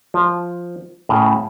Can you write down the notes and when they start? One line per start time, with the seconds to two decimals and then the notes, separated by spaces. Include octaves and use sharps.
0.14 F3
1.09 A2 C#3